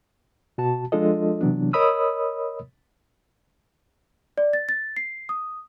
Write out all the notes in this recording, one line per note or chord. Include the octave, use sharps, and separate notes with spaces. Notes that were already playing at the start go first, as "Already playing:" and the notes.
B2 F#4 A5
F3 G#3 D4 F4 A4 D#5
C3 E3 F#3 B3 D4
A#4 C#5 D#5 B5 D#6 E6
D5
A6
A6
C7
D#6